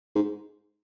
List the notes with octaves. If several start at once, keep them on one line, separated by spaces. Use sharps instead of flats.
G#2